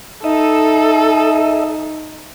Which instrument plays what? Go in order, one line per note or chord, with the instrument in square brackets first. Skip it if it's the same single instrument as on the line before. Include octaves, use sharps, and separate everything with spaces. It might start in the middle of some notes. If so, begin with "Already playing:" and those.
[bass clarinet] D#4 [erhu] A4 [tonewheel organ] D#5 E5